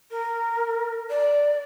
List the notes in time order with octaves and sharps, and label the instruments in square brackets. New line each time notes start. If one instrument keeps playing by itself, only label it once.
[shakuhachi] A#4
D5